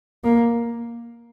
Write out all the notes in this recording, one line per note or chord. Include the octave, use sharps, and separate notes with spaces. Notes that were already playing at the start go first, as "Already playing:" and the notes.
A#3